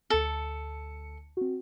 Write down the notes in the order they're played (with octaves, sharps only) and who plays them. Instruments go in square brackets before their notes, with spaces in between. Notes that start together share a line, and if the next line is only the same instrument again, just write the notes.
[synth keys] D2 C#7 [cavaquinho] A4
[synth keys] C4 F#4